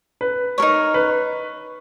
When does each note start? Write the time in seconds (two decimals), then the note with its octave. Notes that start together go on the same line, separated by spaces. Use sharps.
0.21 B4
0.58 D#4 A#4 C#5
0.94 B4